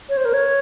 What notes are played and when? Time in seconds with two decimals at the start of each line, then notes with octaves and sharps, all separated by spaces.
0.09 C#5
0.17 C5
0.25 A#4
0.34 C#5